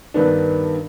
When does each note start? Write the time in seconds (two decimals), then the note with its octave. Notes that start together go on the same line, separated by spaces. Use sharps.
0.14 G2 D#3 B3 D4